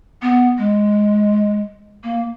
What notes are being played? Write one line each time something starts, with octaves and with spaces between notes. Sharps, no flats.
B3
G#3
A#3